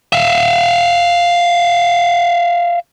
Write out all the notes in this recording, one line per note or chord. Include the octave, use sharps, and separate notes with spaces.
E5 F5